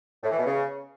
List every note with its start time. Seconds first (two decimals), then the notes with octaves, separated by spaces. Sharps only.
0.24 A2
0.31 E3
0.39 B2
0.47 C#3